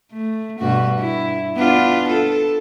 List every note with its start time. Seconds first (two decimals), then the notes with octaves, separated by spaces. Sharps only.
0.12 A3
0.59 G2 B2 F#4
0.99 E4
1.56 B3 D4 F4
2.08 A4